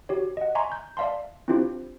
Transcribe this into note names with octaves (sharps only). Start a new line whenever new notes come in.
F#4 G4 C#5
D#5 F#5
E5 G#5 A#5 C6 C#6
G6
D5 E5 F5 A5 C6
C4 D4 E4 F4 G4 C5